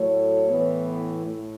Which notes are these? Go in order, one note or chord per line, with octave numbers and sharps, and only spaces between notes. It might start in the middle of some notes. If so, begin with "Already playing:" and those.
Already playing: A2 F#3 A3 C#5
A2 E3 B3
A2